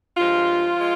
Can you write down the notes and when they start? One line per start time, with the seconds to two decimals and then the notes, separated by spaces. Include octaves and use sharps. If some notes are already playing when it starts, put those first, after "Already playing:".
0.17 G2 F3 G#3 F4
0.76 F3 G#3